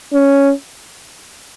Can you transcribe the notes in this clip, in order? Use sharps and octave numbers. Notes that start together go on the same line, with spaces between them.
C#4